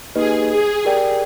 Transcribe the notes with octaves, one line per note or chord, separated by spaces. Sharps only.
A#3 D#4 G4 G#4 B4 D#5
G#4
G4 A#4 D5 G5